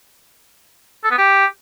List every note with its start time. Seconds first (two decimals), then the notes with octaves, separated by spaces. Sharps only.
1.04 A4
1.11 B3
1.18 G4